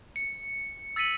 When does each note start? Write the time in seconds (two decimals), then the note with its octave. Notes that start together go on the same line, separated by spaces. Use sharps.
0.16 C#7
0.96 E6 A6 B6 C#7 D#7 F#7